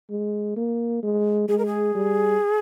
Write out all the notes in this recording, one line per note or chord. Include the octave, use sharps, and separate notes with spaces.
G#3
A#3
G#3
G#3 G#4
A#4
G#4
G3